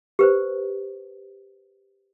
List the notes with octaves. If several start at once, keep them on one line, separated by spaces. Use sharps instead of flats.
G4 B4 C5